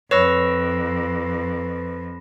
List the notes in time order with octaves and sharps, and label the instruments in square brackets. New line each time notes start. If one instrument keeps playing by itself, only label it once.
[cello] F2 [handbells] B4 C#6 E6 [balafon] C#5 [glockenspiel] B5 A#6 E7